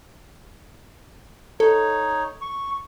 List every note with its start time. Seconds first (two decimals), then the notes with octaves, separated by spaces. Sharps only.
1.60 D#4 A4 C#5
2.41 C#6